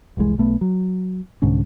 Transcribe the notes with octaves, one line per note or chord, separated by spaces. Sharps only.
F1 C2 E3 G#3
B1 A3 B3
F#3
C2 G#2 D3 C#4